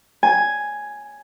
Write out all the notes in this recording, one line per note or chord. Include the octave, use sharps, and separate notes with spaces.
G#5